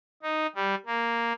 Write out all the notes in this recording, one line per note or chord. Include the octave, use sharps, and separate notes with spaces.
D#4
G3
A#3